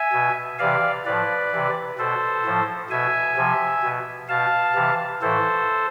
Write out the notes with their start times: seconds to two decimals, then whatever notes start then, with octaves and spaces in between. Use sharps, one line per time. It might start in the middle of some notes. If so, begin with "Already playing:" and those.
Already playing: E5 G#5
0.13 B2
0.59 C3 E3 D5 F5
1.05 A2 F3 B4 D5
1.51 C3 E3
1.98 B2 A4 C5
2.45 A2 F3
2.90 B2 E5 G#5
3.37 C3 F3
3.83 B2
4.29 B2 F5 A5
4.75 C3 E3
5.21 A2 E3 A4 C5